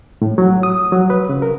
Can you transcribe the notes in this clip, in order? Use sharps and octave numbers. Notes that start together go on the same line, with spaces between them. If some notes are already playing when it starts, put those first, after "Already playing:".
A2
F#3
D#6
F#3
B4
C#3
A#4